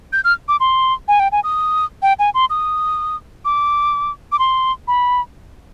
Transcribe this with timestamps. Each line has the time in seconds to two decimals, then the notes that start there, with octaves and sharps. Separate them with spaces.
0.13 G6
0.24 F6
0.48 D6
0.60 C6
1.08 G#5
1.20 G5
1.32 G#5
1.44 D#6
2.02 G5
2.19 G#5
2.34 C6
2.50 D#6
3.45 D6
4.32 D6
4.39 C6
4.88 B5